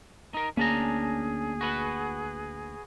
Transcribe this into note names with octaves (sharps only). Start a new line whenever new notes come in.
D#4 A#4
D2 A#3 C#4 D4 G#4 A#5
F#4 B4 F#5